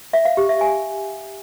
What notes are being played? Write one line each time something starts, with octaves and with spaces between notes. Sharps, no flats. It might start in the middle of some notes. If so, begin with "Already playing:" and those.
E5
F5
G4
E5
G#5